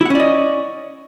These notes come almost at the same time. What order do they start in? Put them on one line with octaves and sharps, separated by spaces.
E4 F#5 C#4 D5 D#5